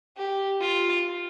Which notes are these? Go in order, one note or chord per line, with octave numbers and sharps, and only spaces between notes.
G4
F4